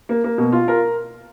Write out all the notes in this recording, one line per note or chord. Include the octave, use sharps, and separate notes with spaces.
A#3
A#3
B2
F4
A#4